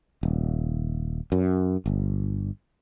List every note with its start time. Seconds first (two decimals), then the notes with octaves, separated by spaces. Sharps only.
0.23 D#1
1.32 F#2
1.86 G1